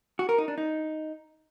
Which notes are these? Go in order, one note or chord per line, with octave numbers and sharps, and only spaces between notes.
F#4
A#4
D#4
D4
D#4